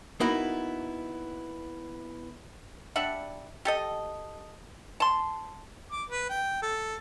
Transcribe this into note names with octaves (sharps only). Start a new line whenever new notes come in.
A#3 B3 D#4 E4 F#4
G3 D4 E5 F#5
G4 A4 D#5
A5 C6
D6
B4
G5
A4